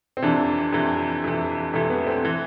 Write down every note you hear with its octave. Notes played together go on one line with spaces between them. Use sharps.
C4
F2 C3 E3 D4
F2 C3 E3
F2 C3 E3
F2 C3 E3 A3
B3
C4
E3